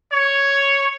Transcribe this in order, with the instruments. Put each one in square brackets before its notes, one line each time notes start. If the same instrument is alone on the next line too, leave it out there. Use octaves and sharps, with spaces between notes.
[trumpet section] C#5